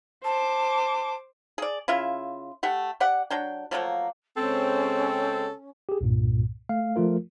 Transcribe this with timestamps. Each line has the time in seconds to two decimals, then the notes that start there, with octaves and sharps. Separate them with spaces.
0.24 C5 A5 D6
1.58 G#4 D5
1.88 C#3 E4 F4 E5
2.63 A3 G4 F#5
3.00 G4 D5 F#5
3.30 F#3 D4 G5
3.71 F3 F#3 A3 A#3
4.37 C#3 G#3 C4 C#4 A4
5.89 G4 G#4
6.01 C2 G2 A#2
6.69 A3 F5
6.96 F3 A3 F4 A#4